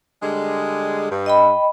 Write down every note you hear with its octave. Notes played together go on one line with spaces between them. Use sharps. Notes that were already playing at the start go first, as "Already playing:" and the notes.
D3 G3 G#3
G2
D#5 G5 B5